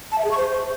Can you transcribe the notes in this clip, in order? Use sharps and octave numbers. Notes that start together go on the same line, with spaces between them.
A5
E5
G#4
C#6
C5